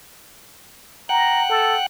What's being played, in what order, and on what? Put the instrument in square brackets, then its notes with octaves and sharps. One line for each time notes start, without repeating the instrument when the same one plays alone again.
[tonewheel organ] F#5 G5 F#6 [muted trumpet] A#5
[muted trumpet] A4